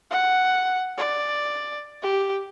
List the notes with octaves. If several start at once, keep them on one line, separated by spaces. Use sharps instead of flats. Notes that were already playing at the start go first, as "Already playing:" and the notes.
F#5
D5
G4